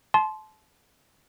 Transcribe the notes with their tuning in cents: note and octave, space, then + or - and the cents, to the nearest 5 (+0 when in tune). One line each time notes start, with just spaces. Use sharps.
A5 -30 C6 +0